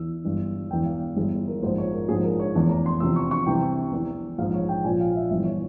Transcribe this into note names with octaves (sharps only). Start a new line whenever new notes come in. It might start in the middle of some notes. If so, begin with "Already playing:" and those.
Already playing: E2 E3 E6
G1 G2 E3
E1 E2 E3 G5
F5
G1 G2 E3 G#4
A#4
A#1 G#2 F3 C5
C#5
A#4
A#1 G#2 F3 G#4
A#4
C#5
F1 E2 E3
A#5
C6
E2 C3 F3 E6
C#6
C#6
C2 C3 E3 G5
E2 E3
A#1 G#2 F3 F5
C#5
G5
A#1 A#2 F3 G#5
F5
E5
G1 G2 E3 E5
C#5